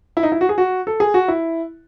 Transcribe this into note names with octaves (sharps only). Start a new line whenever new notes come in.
E4
D#4
E4
F#4
G#4
F#4
A4
G#4
F#4
E4